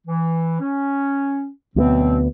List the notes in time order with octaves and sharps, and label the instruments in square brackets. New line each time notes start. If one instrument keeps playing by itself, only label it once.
[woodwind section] E3
C#4
[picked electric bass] D2 G#3 B3 [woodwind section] B2 F#3 C4